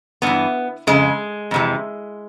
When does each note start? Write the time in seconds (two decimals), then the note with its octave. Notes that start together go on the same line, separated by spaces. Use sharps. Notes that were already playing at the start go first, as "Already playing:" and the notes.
0.22 G2 E3 B3
0.87 F2 C#3 G#3
1.51 F2 C3 E3